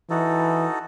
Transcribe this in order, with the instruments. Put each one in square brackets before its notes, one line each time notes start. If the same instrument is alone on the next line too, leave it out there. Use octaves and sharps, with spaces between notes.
[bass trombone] E3 [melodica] D#4 F#4 A4